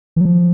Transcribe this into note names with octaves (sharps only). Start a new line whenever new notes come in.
E3
F#3
F3